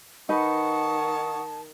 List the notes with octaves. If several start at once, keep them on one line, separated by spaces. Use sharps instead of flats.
D#3 D#4 B4 F#5 A5 C#6 D#6